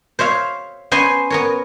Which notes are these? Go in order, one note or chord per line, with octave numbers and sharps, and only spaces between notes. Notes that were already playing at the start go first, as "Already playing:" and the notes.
C5 C#5 E5 F5
B3 C#4 C5 G#5 B5 C6
B3 A#4 C#5